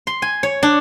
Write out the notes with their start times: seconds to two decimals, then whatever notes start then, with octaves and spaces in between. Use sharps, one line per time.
0.07 C6
0.22 G#5
0.43 C#5
0.63 D4